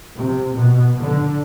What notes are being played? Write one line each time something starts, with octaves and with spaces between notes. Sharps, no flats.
C3
B2
D3